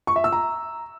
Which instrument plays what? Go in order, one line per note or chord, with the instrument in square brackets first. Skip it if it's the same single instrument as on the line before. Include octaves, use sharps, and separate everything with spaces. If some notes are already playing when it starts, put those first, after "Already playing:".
[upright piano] C#6
E5
E6
A#5